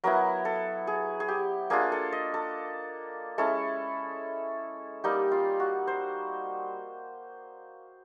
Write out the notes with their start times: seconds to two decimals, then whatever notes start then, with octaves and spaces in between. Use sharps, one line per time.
0.04 F#3 B3 E4 A#4
0.45 A4
0.87 G#4
1.20 G#4
1.28 G4
1.70 A#3 D4 F4 G#4
1.92 A4
2.12 D#5
2.34 A4
3.38 G#3 C#4 E4 A4
5.04 G3 A#3 D#4 G4
5.31 F4
5.60 F#4
5.87 C5